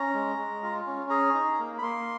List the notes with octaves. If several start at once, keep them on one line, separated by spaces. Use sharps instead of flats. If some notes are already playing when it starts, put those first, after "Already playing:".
Already playing: C#4 A#5
G#3
G#3
F4
C#4
G#4 A#5
D#4
A#3
B5
A#3 C6